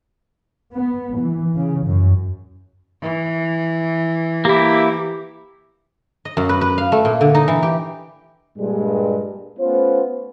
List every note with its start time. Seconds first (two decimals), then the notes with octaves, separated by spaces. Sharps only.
0.73 B3
1.16 E3
1.55 C#3
1.86 F#2
3.02 E3
4.45 A#3 E4 G4
6.25 D#5
6.37 F#2
6.49 B4
6.61 B4
6.78 F5
6.92 A3
7.05 A#2
7.21 D3
7.35 D#4
7.48 E3
7.63 G4
8.58 G2 A#2 G3 G#3
9.60 A3 B3 C#4 F4 B4 C5